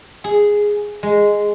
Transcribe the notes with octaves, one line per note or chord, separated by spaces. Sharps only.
G#4
G#3